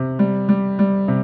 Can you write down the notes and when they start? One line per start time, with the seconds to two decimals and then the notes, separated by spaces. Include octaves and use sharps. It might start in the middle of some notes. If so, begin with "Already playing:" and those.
Already playing: C3
0.19 G3
0.49 G3
0.79 G3
1.08 C3